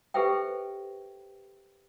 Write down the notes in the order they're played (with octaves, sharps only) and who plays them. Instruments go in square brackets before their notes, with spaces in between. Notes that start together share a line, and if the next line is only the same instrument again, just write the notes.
[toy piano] G4 A4 B4 C5 E5 G5